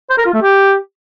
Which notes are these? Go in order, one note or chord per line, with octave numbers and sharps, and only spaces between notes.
C5
A#4
F4
A3
G4